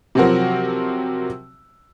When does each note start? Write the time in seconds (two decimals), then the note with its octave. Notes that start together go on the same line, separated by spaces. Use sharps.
0.15 C3 F3 F#3 C4 F#4 A#4